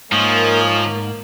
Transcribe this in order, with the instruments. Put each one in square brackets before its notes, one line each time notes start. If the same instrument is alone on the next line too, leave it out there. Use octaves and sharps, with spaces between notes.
[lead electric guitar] G#2 [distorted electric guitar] F3 [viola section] A#3 A#4 [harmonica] C#5 D#5 G#5